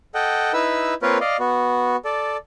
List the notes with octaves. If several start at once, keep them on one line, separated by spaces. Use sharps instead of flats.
A4 D#5 F#5 G5
D#4 E4 B4 E6
A#3 C4 F4 A#4 B4 C#5
D5 D#5 F5
B3 F#4
A4 D5